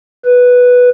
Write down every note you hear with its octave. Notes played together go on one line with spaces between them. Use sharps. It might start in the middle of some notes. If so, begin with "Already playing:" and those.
B4